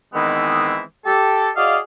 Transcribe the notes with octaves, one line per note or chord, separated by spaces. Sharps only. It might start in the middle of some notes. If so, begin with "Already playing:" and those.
D#3 E3 G#3 B3 C4 E4
G4 A4
F#4 G#4 D5 D#5 F5